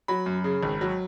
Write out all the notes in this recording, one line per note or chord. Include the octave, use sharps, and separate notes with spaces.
F#3 B5
F#2
C#3
G#1
F#3